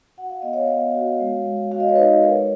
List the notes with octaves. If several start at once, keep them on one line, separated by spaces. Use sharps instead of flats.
F#4 F#5
F5
B3 D#5
C#5 F5
B3
F#4
G#3
G#3
F#4 F5
D#5
C#5
D#4 B4 D#5
G#3 A#4 C#5